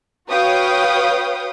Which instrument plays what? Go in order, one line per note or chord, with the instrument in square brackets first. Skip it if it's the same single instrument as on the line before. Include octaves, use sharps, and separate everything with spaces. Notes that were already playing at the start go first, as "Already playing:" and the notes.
[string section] F#4 B4 C#5 F5 G5 D#6